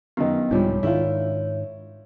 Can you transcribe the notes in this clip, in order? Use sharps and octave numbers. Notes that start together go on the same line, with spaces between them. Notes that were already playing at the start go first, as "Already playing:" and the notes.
F#2 D#3 B3 D#5
C2 G#2 D3 F3 G3 D4 C#5
G#2 D#3 D4 E4 F4 C#5 E5